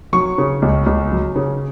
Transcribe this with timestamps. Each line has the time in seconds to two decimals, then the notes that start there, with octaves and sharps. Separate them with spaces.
0.13 F#3 C#6
0.38 C#3
0.62 C#2
0.86 C#2
1.12 F#3
1.36 C#3